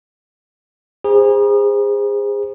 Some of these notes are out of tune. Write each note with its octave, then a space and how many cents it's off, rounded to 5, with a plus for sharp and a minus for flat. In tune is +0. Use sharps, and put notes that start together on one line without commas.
G#4 -30 C5 +0 A#5 +45